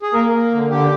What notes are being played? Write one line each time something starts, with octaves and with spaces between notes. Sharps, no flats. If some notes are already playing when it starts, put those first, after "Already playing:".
G#4
A#3 A#4
A#3
D3
D3 G4